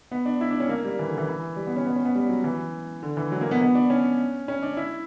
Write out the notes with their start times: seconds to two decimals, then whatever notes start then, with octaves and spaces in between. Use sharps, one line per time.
0.11 B3
0.25 D4
0.41 E4
0.51 D4
0.60 C#4
0.69 A#3
0.85 G3
0.99 E3
1.08 D3
1.18 E3
1.28 E3
1.56 G3
1.67 B3
1.76 C#4
1.86 B3
1.96 C#4
2.05 B3
2.15 G3
2.29 F#3
2.44 E3
3.03 D3
3.17 E3
3.32 F#3
3.41 A#3
3.51 B3
3.61 B3
3.75 D4
3.90 C#4
4.48 C#4
4.62 D4
4.77 E4